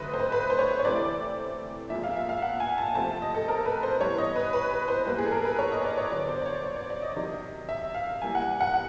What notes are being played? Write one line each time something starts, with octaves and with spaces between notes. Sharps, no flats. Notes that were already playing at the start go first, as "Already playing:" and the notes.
Already playing: D3 F#3 A3 C4 B4 D#5
C5
B4
B4
C5
C#5
C#5
C3 E3 A3 C4 D5
A#2 F3 G#3 E5
F5
E5
F5
F#5
G#5
A5
C3 F3 A3 C4 A5
D#5
A4
A#4
B4
C5
E3 G3 B3 C#5
D#5
B4
B4
B4
C5
E3 G3 A#3 B4
G#4
A4
A#4
B4
C#5
D#5
D5
C#5
D3 F#3 B3 D5
C5
D5
C#5
D5
D5
D5
D#5
C3 D#3 F#3
E5
F5
E3 G3 A#3 G#5
F#5
F#5
F#5